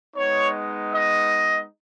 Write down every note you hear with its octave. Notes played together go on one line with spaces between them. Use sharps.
G#3 B3 D#4 C#5
D#5